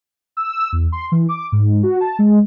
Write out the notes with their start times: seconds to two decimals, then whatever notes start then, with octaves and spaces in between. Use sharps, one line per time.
0.37 E6
0.72 E2
0.92 C6
1.12 E3
1.29 D6
1.52 G#2
1.83 F#4
2.00 A5
2.19 G#3